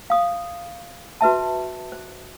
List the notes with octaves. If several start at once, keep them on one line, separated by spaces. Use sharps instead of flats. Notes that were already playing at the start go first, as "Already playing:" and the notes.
F5 D#6
F#4 B4 E5 A5
C5